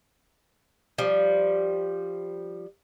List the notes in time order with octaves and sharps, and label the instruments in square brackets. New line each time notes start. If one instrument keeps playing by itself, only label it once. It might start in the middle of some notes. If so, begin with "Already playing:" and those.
[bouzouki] F3 G3